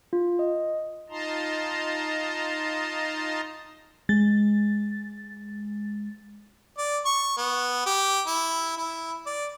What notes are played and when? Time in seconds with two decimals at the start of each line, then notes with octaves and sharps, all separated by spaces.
0.13 F4
0.39 D#5
1.10 D#4 F4 D#5 A5 A#5 C6
4.09 G#3 A6
6.78 D5
7.06 C#6
7.37 B3
7.86 G4
8.27 E4
8.77 E4
9.27 D5